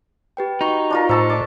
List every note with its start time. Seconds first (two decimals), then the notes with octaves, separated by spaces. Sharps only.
0.37 G4 B4 G5
0.61 D#4 F#4 C#6
0.90 D4 F4 A#4
1.09 A2 C5 E5 A5 C#6 E6
1.30 A4 D5 D6 A6